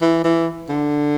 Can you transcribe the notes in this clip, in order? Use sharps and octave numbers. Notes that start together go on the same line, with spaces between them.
E3
E3
D3